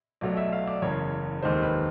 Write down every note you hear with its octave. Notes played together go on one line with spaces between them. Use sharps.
B1 B2 F#3 A3 D5
E5
F5
D5
F#1 E2 C#3 C#5
F1 D#2 D#3 G#3 C5
B4